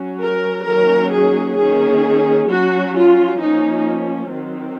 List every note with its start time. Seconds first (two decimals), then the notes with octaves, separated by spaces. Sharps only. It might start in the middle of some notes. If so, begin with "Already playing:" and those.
Already playing: F#3 C#4
0.20 A#4
0.65 D#3 F#3 A#3 C#4 A#4
1.11 G#4
1.57 D#3 A#3 C#4 G#4
2.48 F#3 C#4 F#4
2.94 F4
3.40 F3 A#3 C#4 D#4
4.31 D#3 F#3 C4